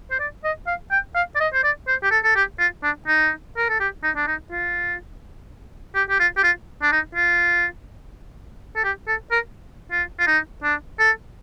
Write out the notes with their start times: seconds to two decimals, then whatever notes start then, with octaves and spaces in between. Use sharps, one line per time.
0.11 C5
0.20 D5
0.45 D#5
0.67 F5
0.91 G5
1.15 F5
1.35 D5
1.41 D#5
1.54 C5
1.64 D5
1.88 C5
2.03 G4
2.11 A4
2.24 A4
2.36 G4
2.59 F4
2.83 D4
3.08 D#4
3.58 A#4
3.69 A4
3.80 G4
4.03 D#4
4.16 D4
4.27 D#4
4.51 F4
5.95 G4
6.10 G4
6.20 F4
6.37 G4
6.44 F4
6.82 D4
6.92 D#4
7.15 F4
8.76 A4
8.84 G4
9.08 A4
9.32 A#4
9.92 F4
10.20 F4
10.27 D#4
10.64 D4
10.99 A4